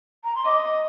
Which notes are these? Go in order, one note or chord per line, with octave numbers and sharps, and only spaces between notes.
A#5
C6
D#5 D6